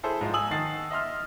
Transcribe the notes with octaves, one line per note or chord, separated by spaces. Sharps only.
E4 G#4 A4 C5 E5
G#2 F3
G#5 D#6 E6 F#7
D#3 F#5 A5 A6 C7
D#5 E5 C6 F6